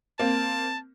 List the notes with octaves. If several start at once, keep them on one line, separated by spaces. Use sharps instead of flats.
A#3 C4 A5